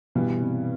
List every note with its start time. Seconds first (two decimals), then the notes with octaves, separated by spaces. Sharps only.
0.15 G2 B2 E3 G3 B3
0.41 C3